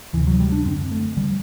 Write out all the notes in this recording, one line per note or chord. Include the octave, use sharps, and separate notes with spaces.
D2 C3 E3
F#3
G3
D4
F#2 D3 C4
A3
D3 G3